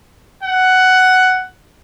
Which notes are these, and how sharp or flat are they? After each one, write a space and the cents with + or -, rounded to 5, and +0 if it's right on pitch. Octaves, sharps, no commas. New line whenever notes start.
F#5 +10